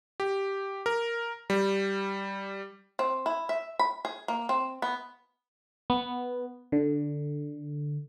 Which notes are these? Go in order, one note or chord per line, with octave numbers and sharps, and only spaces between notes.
G4
A#4
G3
C4
E4
E5
B5
G#4
A#3
C4
B3
B3
D3